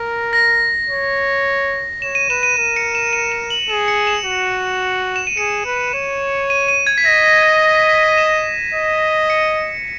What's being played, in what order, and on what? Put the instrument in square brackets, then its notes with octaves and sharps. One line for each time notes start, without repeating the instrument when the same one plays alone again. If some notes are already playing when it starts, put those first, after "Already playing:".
Already playing: [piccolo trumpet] A#4 [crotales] A#6
[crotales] A#6
[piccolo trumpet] C#5
[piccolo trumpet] C#5 [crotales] E7
[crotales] D#7
[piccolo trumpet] B4 [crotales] E7
[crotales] D#7
[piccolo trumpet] A#4 [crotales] D#7
[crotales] C#7
E7
D#7
E7
F#7
[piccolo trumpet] G#4 [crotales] E7
[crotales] C#7
E7
[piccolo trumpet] F#4
[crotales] E7
D#7
[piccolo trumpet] G#4 [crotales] C#7
[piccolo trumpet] B4
[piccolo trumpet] C#5 [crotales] E7
[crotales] D#7
D#7
G#6
B6
[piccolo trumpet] D#5 [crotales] A#6
[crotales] A#6
G#6
A#6
B6
B6
D#7
E7
[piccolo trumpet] D#5
[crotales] C#7